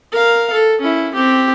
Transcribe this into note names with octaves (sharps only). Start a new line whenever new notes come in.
A#4 F5
A4
C#4 E4
C4 G4